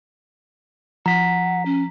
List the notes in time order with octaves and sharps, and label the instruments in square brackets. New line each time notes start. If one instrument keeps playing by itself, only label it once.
[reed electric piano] F3 [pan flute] F#5 [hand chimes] A#5 B6
[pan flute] C#4